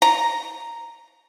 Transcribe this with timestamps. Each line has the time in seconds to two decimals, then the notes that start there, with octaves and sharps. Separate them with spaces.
0.02 A#5